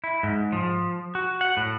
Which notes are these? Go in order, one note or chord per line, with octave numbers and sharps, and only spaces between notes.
E4
G#2
F3
F#4
F#5
A2